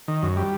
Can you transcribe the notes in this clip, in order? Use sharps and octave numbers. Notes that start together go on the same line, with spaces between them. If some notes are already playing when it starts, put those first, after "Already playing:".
D#3
F#2
G3